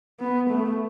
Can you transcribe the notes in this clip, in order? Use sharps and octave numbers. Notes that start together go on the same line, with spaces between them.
B3
A3